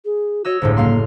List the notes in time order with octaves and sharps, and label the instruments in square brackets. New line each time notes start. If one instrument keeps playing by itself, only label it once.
[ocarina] G#4
[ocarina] F#4 [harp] C#5 D#5 E6
[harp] G1 C#2 A2 [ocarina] C5
[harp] F#1 F5 C6 [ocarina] A#3